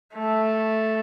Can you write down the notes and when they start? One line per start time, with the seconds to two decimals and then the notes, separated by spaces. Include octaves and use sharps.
0.15 A3